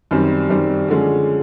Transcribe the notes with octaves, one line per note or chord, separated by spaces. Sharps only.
F#2 D#3 G3 C4
F#2 D#3 G3 C4
D3 F3 G#3 C#4